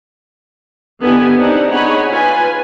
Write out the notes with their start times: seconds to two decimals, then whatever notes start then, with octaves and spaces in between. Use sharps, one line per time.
1.01 D3 D#3 B3 E4 G4 G#5
1.36 C4 D4 D#4 G4 F#5
1.72 D#4 G#4 C#5 F#5 G#5 B5
2.10 F4 B4 G#5